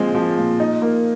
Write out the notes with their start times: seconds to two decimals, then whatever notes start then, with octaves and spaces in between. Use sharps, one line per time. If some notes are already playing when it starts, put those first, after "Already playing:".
Already playing: A#2 F3 G#3 C4
0.15 F3
0.37 A#2
0.60 D#4
0.82 A#3